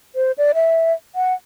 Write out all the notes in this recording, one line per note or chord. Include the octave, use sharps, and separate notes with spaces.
C5
D5
E5
F#5